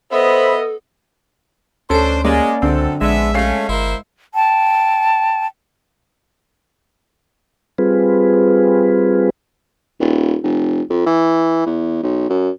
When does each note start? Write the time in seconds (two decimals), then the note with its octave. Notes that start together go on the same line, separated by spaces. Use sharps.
0.12 B3 A4 C5 D#5 E5 B5
1.90 D2 C#4 D4 A4 C5 D7
2.25 G#3 A#3 C#4 D5
2.62 C#2 F#2 D3 C4 A4
3.01 A#1 G#3 B3 D4 E5
3.34 A3 C#4 F5 C7
3.68 G1 E4 A#4 C5
4.35 G5 A5
7.78 G3 C4 F4 G#4 B4
10.00 D#1
10.43 F1
10.90 F2
11.06 E3
11.66 E2
12.03 B1
12.30 F#2